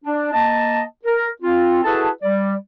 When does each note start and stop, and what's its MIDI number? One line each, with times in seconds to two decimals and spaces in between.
0.05 0.30 62
0.33 0.81 58
0.33 0.81 75
0.33 0.81 81
1.05 1.28 70
1.42 1.83 60
1.42 1.83 65
1.83 2.09 64
1.83 2.09 66
1.83 2.09 68
1.83 2.09 69
1.83 2.09 71
1.83 2.09 81
2.22 2.54 55
2.22 2.54 74